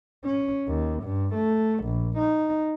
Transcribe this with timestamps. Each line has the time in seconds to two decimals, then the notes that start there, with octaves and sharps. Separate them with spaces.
0.25 C#4
0.68 D#2
1.03 G2
1.35 A3
1.84 A#1
2.18 D#4